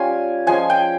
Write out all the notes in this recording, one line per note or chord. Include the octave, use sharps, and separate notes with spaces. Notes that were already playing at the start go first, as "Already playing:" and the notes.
Already playing: G3 C#4 F4 G#5
F3 G#3 C#4 G#5
G5